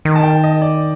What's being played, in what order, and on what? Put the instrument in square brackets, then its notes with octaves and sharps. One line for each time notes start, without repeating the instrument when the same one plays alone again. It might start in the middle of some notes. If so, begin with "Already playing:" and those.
[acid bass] D#3
[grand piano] A5
G5
D#5
D5